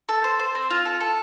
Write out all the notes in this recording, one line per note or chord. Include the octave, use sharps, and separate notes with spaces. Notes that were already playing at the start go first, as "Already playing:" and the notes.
A4
C5
C5
C4
F4
A4
A4